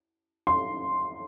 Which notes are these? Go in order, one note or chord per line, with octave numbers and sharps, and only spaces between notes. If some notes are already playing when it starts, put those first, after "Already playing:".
C6